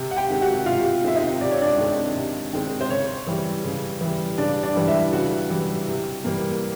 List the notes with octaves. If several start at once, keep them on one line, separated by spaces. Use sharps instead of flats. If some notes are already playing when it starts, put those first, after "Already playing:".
Already playing: C3
F#5
G4 G5
D#3 G#3 C4
F#4 F#5
C3 F4 F5
D#3 G#3 C4 E5
D#4 D#5
C3 D5
C#5
D4 D5
D#3 G#3 C4
C3
D#3 G#3 C4
C5
C#3 C#5
E3 G3
C#3
E3 G3
C#3 D4 D5
D4 D5
E3 G3
E4 E5
C#3 F#4 F#5
E3 G3
C3
E3 G3 A#3